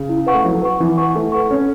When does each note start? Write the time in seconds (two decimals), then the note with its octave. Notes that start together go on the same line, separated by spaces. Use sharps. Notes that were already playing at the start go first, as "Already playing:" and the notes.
Already playing: C#3
0.09 E4
0.27 B4 F#5 C#6
0.34 A3
0.44 F#3 E4
0.62 B4 F#5 C#6
0.80 E3 E4
0.98 B4 F#5 C#6
1.15 A3 E4
1.32 B4 F#5 C#6
1.49 C#4 A4